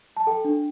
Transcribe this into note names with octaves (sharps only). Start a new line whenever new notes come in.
A5
A4 G5
D4